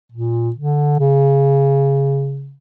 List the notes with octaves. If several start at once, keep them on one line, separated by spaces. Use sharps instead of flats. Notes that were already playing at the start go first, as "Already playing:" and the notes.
A#2
D3
C#3